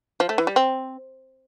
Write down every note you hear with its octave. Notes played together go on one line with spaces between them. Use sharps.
F3
A3
E3
G3
C4